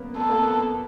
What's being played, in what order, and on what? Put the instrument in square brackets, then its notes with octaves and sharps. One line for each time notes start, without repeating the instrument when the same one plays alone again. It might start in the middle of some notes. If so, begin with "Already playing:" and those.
Already playing: [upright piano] A#3 B3 C#4
[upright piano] B3 [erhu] A4
[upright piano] A#3
B3